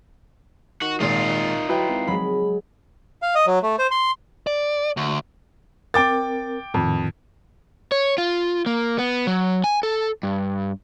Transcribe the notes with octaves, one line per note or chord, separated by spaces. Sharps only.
D#3 F#4
G#1 A#2 D#4 F4
F#3 E4 B4 G5
G#1
F#3 G#3 B5
F5
D#5
F#3
A3
C5
C6
D5
D2
C4 A#4 G5 D6 A6
F2 A2 D#3
C#5
F4
A#3
B3
F#3
G#5
A4
G2